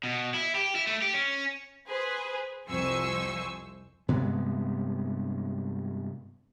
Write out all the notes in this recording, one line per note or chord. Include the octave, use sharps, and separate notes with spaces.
B2
E4
G4
E4
A3
G4
C#4
G#4 B4 C5
C2 F2 C5 G#5 C#6 E6
G2 C3 G#3 B3